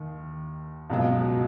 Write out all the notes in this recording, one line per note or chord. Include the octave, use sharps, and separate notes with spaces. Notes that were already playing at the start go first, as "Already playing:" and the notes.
Already playing: D#2 D#3
C#2 B2 F#3